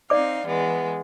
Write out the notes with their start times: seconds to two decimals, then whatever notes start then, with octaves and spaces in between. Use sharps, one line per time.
0.10 C4 D#4 D5 F5 D6
0.47 E3 G#3 B3